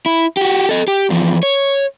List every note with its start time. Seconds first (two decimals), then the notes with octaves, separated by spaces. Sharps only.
0.06 E4
0.37 F#4 G4
0.69 A4 D#5
0.88 G4
1.10 E2 F3
1.43 C#5